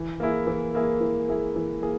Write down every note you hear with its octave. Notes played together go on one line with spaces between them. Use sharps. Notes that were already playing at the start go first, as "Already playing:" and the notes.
Already playing: E3
A#3 E4 G#4
E3
A#3 E4 G#4
E3
A#3 E4 G#4
E3
A#3 E4 G#4